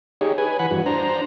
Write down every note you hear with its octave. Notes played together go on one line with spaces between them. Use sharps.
D#4 G4 G#4 C#5
B4 G#5
E3 F#5 B5
G2 E3 F#4
D4 C5 A#5